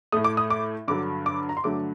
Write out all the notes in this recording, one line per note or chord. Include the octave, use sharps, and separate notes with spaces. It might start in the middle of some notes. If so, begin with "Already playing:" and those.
A2 A3 D#6
D6
D#6
D6
G2 D3 F#3 D6
D6
A#5
C6
G2 D3 F#3 A3 D6